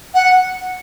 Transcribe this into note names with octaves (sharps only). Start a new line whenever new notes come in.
F#5